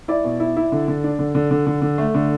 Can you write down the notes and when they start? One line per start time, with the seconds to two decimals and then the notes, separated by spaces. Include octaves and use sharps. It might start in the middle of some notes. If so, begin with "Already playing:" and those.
0.08 E4 D5
0.24 B2
0.40 E4
0.56 E4
0.72 D3
0.88 D3
1.04 D4
1.19 D3
1.35 D3
1.51 D3
1.66 D3
1.82 D3
1.98 A3
2.14 D3